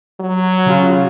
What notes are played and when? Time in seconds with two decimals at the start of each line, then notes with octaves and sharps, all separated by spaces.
0.20 F#3
0.66 C#3 F4 F#4